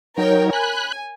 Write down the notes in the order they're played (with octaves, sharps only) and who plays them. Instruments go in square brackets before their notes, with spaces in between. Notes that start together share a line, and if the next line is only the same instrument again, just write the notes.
[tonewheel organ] F#3 D#4 [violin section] A#4 C#5 G5
[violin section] G#5 [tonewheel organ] B5 F#6